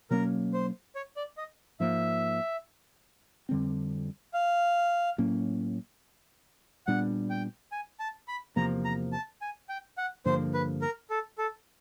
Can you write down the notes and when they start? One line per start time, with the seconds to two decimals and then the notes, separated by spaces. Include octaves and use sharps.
0.11 B2 F#3 A#3 C#4 A#4
0.53 C5
0.95 C#5
1.17 D5
1.37 D#5
1.80 G#2 F3 A#3 E5
3.49 F2 D3 G3 C4
4.34 F5
5.18 A2 F#3 A#3 C#4
6.87 A#2 G3 B3 D4 F#5
7.30 G5
7.72 G#5
8.00 A5
8.28 B5
8.56 E2 C3 F3 A#3 A#5
8.85 A#5
9.12 A5
9.41 G#5
9.69 G5
9.98 F#5
10.25 G2 D3 F3 A#3 C5
10.54 B4
10.82 A#4
11.10 A4
11.38 A4